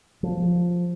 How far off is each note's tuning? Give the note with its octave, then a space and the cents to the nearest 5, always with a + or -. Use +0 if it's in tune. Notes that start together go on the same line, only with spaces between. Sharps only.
F3 +5